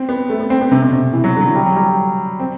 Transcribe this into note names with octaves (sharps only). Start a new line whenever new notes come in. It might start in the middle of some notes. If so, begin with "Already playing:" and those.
Already playing: C4
B3
A3
B3
C4
B3
C3
B2
C3
E3
F#3
D3
F#3
E3
G3
F#3
G3
C4